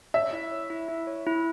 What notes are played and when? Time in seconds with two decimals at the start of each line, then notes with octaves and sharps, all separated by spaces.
0.14 C#5 E5
0.33 E4
0.52 C#5
0.70 E4
0.89 E4
1.07 C#5
1.27 E4